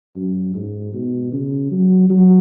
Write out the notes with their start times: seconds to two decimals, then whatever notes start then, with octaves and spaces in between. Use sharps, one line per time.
0.16 F#2
0.54 G#2
0.94 B2
1.32 C#3
1.71 F#3
2.10 F#3